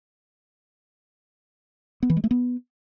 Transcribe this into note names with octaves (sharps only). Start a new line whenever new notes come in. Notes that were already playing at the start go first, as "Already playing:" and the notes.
B3
E3
G#3
A3
B3